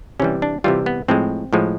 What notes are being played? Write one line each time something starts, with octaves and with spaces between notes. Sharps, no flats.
C3 E3 G3 C#4
D4
C3 E3 G3 F4
B3
A2 F3 G#3 C4
A2 F3 G#3